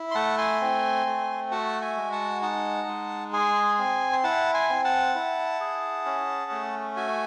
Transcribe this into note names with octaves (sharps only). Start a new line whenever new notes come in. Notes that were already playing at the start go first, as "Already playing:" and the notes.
Already playing: E4
C6
A3 F#5 A5
G#5 C6
C4
A3
F#4 F#5 A5
E5 G#5
G#3
F#5 A5
D#4 F#5 A5
G#3
G#4 G#5 C6
C4
C6
E4 F#5 A5
G#5 C6
C4
F#5 A5
E4
G#4
C#4
A3
F#4 E5 G#5